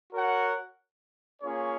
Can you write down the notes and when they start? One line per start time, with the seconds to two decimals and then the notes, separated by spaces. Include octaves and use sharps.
0.13 F#4 A#4 C#5 F#5
1.42 A#3 C#4 F4 G#4 C#5